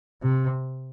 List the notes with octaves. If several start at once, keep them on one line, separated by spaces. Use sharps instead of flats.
C3